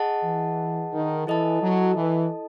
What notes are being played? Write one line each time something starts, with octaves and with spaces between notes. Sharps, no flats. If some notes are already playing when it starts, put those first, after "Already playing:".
Already playing: G#4 D#5 F#5 A5
E3
D#3
E3 E4 A4 D#5 A5
F#3
E3